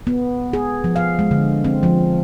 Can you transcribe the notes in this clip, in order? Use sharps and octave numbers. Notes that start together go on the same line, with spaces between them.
B3
G#4
F3
F5
G#3
D3
C4
F3